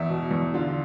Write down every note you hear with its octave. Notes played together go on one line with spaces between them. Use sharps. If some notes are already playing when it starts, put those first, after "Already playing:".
Already playing: E2 E5
B2
E2
D3 F4